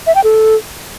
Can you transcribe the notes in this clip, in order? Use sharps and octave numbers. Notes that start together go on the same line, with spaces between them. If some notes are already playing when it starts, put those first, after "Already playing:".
E5
G5
A4